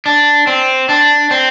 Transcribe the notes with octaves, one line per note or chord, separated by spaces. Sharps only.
D4
C4
D4
C4